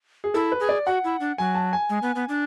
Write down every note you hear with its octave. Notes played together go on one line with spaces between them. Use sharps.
G#4
E4 A4
B4
G#4
D5
F#4 F#5
E4
D4
F#3 G#5
A5
G#5
G#3
B3
B3
D4